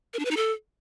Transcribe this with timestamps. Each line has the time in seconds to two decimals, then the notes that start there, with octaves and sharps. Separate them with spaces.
0.13 A#4
0.19 D4
0.25 B4
0.31 D#4
0.37 A4